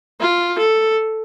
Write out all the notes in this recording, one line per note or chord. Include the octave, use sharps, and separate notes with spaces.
F4
A4